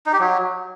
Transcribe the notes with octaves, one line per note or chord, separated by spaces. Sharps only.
D#4
G4
F#3